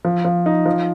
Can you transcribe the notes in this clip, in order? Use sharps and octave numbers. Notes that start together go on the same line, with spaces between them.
F3
F3
D#4
F3